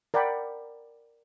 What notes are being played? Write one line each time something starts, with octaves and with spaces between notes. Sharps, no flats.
A#4 D5 F#5 G5 B5